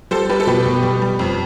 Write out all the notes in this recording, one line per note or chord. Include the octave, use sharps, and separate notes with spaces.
G3 A4 C5
G3 G4 B4
A4
B2 G4 B4
B2
G3
G3
F2